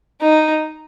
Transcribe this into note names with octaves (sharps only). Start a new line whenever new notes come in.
D#4